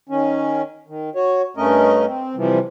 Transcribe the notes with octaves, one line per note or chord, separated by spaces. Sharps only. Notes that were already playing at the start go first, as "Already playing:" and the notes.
D#3 C#4
D#3
F#4 C#5
G2 A3 C#4 A#4 D#5
C4
C3 E3 F3 G3